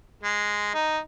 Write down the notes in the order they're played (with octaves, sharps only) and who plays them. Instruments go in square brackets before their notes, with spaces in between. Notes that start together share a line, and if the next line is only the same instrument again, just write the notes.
[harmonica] G#3
D#4